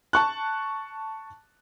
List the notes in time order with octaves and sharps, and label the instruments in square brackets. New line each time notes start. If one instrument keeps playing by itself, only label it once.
[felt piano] A5 C#6 F#6